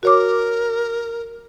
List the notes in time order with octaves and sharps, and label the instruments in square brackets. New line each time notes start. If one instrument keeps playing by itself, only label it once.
[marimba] F#4 C#5 D6 [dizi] A#4